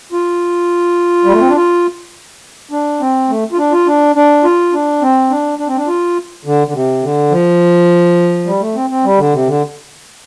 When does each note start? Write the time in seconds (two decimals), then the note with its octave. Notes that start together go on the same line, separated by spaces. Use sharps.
0.12 F4
1.25 G3
1.32 A3
1.40 C4
1.48 D4
1.56 F4
2.71 D4
3.01 C4
3.29 A3
3.52 F4
3.58 D4
3.72 F4
3.86 D4
4.16 D4
4.44 F4
4.73 D4
5.02 C4
5.30 D4
5.59 D4
5.68 C4
5.77 D4
5.87 F4
6.45 D3
6.67 D3
6.74 C3
7.03 D3
7.31 F3
8.46 G3
8.60 A3
8.75 C4
8.90 C4
9.04 G3
9.18 D3
9.33 C3
9.47 D3